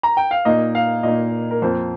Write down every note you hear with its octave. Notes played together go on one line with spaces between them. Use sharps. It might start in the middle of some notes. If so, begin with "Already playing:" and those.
A#5
G5
F5
A#2 A#3 D#4 D#5
F5
A#2 A#3 D#4 D#5
A#4
F2 F3 A#3 C5